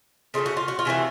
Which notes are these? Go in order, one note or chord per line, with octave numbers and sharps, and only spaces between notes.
C#3 E3 A3 C#4 F4
F#4
F4
F#4
F4
C3 E3 A3 F#4